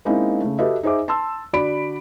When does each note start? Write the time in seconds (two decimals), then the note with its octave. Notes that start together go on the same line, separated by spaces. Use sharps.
0.05 G#3 A#3 C4 C#4 D#4 E4
0.41 C#3 A3
0.59 F#4 G4 A4 B4 D#5 E5
0.83 D#4 G#4 C5 E5 D6
1.08 A5 C6 E6
1.53 D3 F#4 D5 B5 D7